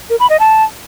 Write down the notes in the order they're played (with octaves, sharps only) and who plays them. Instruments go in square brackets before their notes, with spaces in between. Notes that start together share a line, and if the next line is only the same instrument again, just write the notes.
[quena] A#4
B5
D#5
A5